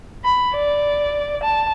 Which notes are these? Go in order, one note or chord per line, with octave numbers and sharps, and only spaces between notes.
B5
D5
A5